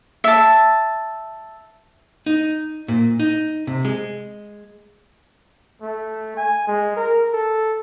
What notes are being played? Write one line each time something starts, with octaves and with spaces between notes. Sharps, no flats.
E5 A5
D#4
A#2
D#4
C3
G#3
A3
G#5
G#3
A#4
A4